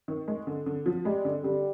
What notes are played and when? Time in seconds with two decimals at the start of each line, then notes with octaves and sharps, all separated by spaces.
0.08 D#3
0.28 G#3
0.47 D3
0.66 D3
0.86 F3
1.05 G3 G#3
1.25 D3
1.44 D3 G3